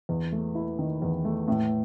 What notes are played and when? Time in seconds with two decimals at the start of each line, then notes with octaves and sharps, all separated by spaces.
0.09 E2
0.32 A3
0.55 E4
0.79 D#3
1.02 E2
1.25 A3
1.48 A2